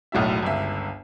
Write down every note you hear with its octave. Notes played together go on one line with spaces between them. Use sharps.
E1 B1 A2 F#3 E5
G1 C#2 E5